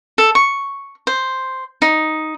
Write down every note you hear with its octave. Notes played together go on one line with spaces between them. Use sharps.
A4
C#6
C5
D#4